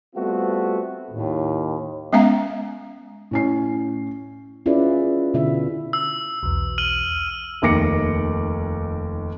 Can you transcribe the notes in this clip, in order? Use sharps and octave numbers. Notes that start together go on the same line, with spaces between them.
G3 A3 B3 C4 F4 F#4
D#2 A2
G#3 B3 C#4 E5 F5 A#5
A2 C#4 C7
C#4 E4 F4 G#4 B4 D5
B2 D3 B3 E4 E5
E6
B1 E2
F6 D#7 F#7
F1 D#2 D6 A#6 C#7